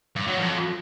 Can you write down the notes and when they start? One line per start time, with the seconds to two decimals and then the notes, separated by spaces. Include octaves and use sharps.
0.16 G2
0.27 F#3
0.38 F2